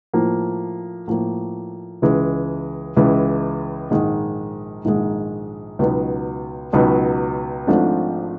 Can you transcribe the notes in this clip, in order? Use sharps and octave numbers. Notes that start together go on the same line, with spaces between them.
A2 F3 A#3
A2 F3 A#3
C#2 C#3 E3 G#3
C#2 C#3 E3 G#3
A#1 G#2 D#3 G#3
A#1 G#2 D#3 G#3
C#2 B2 F#3 B3 D#4
C#2 B2 F#3 B3 D#4
G#1 G#2 F3 A3 D4